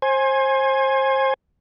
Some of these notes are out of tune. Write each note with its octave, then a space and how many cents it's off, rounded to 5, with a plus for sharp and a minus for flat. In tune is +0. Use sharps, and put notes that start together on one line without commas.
C5 +30 G#5 +0